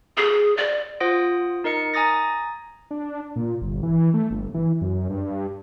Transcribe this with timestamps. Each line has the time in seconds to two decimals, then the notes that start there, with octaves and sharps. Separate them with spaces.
0.17 G#4
0.57 D5
1.00 F4 C5 F#5 D#6 A#6 D7
1.64 D#4 A#4 D#5 C#7
1.94 G#5 A#5 D#6 A6 A#6
2.91 D4
3.36 A#2
3.61 G1
3.83 E3
4.14 A3
4.31 G1
4.54 E3
4.81 F#2
5.09 G2